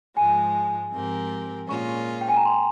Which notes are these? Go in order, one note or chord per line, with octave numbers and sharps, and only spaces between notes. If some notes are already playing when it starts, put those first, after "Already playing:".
G#2 F3 G#3 G#5
G#2 F3 C4 G4 A#4
A#2 G#3 C#4 F4 C#6
G5
G#5
A#5
C6